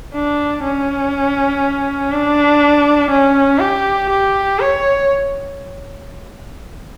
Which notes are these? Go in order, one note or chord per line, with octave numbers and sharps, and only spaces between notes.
D4
C#4
D4
C#4
G4
G4
C#5